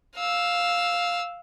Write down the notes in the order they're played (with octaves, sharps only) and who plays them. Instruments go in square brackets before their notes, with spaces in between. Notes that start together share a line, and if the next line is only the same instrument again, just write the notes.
[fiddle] F5 E6